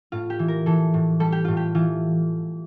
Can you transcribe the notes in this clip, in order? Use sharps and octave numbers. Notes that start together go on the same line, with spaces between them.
A2 F4
G4
E3
A#4
E3 A4
A2
G3 A4
G4
A2 F4
G4
E3 F4